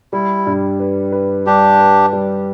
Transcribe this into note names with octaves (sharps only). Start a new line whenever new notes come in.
G3 E4
G2
B4
B4
G3 D4 G4
B4
G3